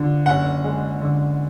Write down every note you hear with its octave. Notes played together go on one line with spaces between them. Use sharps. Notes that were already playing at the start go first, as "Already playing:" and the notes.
Already playing: D3 F3
F#1 F#5
G#3
D3